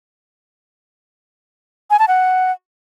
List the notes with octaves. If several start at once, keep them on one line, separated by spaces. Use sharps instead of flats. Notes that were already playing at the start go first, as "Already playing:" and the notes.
G#5
A5
F#5